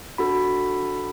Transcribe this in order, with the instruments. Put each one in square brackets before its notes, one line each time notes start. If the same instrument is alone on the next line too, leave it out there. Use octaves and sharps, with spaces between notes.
[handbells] D4 F#4 A4 B5